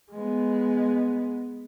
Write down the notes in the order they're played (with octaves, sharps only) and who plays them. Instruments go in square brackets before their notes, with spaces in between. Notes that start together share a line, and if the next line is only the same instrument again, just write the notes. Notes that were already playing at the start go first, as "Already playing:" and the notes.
[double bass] G#3 B3